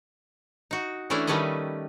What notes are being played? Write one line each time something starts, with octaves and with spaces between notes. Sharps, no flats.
D#4 F#4
E3 A3 C#4 D4 E4
D#3 G3 A3 C#4 B4 D#5